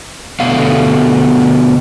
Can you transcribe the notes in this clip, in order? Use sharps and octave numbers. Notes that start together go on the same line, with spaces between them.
B2 D3 A3 B3 F5